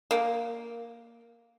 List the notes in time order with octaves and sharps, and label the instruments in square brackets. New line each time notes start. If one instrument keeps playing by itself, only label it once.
[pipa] A#3